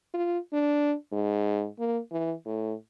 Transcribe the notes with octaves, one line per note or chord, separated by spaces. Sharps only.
F4
D4
G#2
A#3
E3
A2